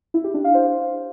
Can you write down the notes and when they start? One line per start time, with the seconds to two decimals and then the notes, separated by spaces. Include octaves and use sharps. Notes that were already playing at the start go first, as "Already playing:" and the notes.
0.14 E4
0.24 G4
0.34 D4
0.44 F5
0.54 C5